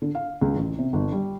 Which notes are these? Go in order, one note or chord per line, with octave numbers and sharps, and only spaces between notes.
D3
F5
C#2
A1
C3
G1
G3